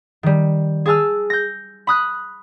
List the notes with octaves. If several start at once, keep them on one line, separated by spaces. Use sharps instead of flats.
D#3 G3
G#4 G#5 A5 E6 F6
G6 A#6
B5 D#6 F#6